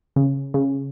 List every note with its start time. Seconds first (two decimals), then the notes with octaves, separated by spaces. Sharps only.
0.16 C#3
0.54 C#3